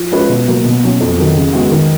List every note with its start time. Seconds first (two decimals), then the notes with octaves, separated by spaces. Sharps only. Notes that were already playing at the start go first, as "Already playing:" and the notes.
Already playing: F3
0.12 G#3 C#4 F4 B4
0.29 B2
0.47 F#3 A#3
0.65 B2
0.83 F#3 C#4
1.00 F2
1.18 D#3 F#3
1.36 C#3
1.53 G#3 B3 F#4
1.71 D#3